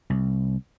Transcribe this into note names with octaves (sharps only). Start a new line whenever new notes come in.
C2